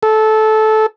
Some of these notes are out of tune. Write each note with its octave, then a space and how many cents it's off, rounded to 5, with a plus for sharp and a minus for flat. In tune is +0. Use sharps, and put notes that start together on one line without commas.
A4 -15